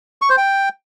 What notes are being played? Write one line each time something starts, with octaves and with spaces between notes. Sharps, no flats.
C#6
C5
G5